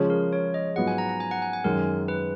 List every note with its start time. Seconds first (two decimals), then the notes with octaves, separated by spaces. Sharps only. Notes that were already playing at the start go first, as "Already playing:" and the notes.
Already playing: C#3 F3 G#3 C#4
0.10 A#4
0.33 C#5
0.54 D#5
0.76 G#2 F#3 B3 F4 G#4 F#5
0.88 G#5
0.98 A#5
1.09 A#5
1.20 G#5
1.31 F#5
1.42 G#5
1.53 G#5
1.64 F#2 D#3 G#3 C#4 A#4
2.08 B4